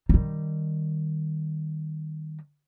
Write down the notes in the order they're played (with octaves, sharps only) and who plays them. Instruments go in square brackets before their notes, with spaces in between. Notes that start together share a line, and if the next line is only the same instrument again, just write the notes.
[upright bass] D#3 G3